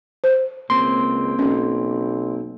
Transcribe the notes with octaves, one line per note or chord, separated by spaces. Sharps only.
C5
C#2 A#3 C4 C6
B1 C#4